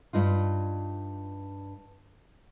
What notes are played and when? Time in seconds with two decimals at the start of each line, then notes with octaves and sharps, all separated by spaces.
0.13 G2 D#4 F4